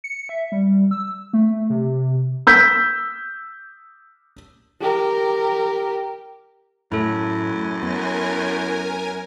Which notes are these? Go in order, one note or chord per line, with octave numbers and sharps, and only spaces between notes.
C#7
E5
G3
E6
A3
C3
E6 G6 B6
G4 A#4
F#2 A2 E4 A4
B3 A#4 G#5